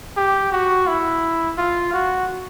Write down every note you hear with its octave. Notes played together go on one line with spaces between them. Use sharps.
G4
F#4
E4
F4
F#4